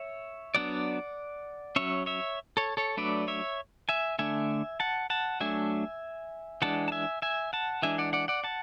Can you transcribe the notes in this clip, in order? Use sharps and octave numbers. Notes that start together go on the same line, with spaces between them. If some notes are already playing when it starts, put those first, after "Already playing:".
Already playing: C#5 E5
F#3 B3 D4 D5 F#5
F#3 C#4 C#5 E5
C#5 E5
A4 C#5
A4 C#5
F#3 A3 D4 B4 D5
C#5 E5
E5 G#5
D3 A3 D4 E5 G#5
F#5 A5
F#5 A5
F#3 A3 D4 E5 G#5
E3 G#3 D4 F#5 A5
A5
E5 G#5
E5 G#5
F#5 A5
E3 G#3 D4 E5 G#5
D5 F#5
D5 F#5
D5 F#5
F#5 A5